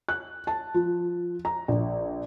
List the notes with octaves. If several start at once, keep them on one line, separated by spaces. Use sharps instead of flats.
F#6
A5
F3
A#5
A#1